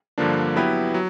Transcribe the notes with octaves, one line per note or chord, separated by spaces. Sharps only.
G2 D3 F3 A#3 D4
F#3 B3 E4 G4 B4
F#3